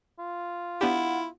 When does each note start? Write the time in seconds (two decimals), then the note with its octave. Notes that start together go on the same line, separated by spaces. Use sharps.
0.19 F4
0.81 B3 D4 E4 G4 F#5